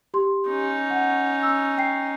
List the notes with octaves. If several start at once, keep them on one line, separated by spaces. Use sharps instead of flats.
G4 C6
C#4 D#4
F#5
E6
G5 C7